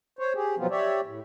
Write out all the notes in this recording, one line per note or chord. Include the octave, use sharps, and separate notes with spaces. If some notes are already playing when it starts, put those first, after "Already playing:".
C5 C#5
G4 G#4
B2 F3 F#3 B3 C4 F4
G4 C#5 D5 E5
A2